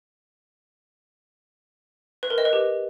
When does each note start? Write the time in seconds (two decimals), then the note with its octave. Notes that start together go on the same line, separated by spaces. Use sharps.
2.23 B4
2.30 A#4
2.38 D#5
2.45 B4
2.53 G4